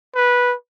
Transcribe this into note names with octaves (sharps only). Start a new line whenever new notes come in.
B4